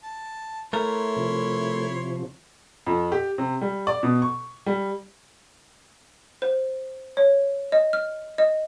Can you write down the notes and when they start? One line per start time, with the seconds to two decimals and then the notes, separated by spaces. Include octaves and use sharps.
0.03 A5
0.73 A3 E4 A#4 C#5 C6
1.17 C3 F3
2.86 F2
3.12 G4
3.38 C3
3.61 G3
3.87 D5
4.03 B2
4.22 C#6
4.66 G3
6.42 C5
7.17 C#5
7.72 D#5
7.93 F6
8.38 D#5